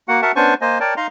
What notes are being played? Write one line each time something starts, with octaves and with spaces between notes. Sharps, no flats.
A#3 F#4 F#5
F#4 A#4 E5 F#5 A5
B3 C#4 D4 C5 G#5 C#6
A#3 C5 D#5 G#5
A#4 C#5 D5 G5 A5
D#4 D#5 F5 A#5 C6